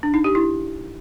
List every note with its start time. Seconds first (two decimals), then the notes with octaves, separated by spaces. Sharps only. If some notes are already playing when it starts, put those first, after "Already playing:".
0.03 D4
0.14 D#4
0.24 G4
0.35 E4